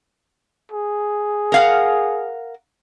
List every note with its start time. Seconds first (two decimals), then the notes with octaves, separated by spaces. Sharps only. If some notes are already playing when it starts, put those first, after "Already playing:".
0.72 G#4
1.52 A#4 F5 F#5